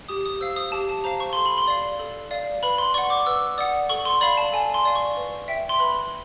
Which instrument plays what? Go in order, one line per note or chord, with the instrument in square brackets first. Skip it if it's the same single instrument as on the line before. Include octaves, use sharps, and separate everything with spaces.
[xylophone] G4 D#6
D#6
C5 F5 E6
D#6
G4 A5
A5
C5 F5 A#5
C#6
A4 C6
B5
C6
D5 F5
A4
D5 F5
B4 B5
C6
D5 F#5 C#6
D6
B4 E6
D5 F#5 D#6
A4 C#6
C6
D5 F5 B5
A5
A4 G#5
C6
D5 F5
C#6
B4
E5 G5
C6
B4 B5